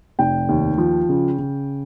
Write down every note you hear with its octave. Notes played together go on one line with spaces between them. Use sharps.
F1 G5
D#2
F3
C#3
C#3